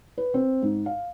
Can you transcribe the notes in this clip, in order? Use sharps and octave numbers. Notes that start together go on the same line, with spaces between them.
B4
C4
G#2
F5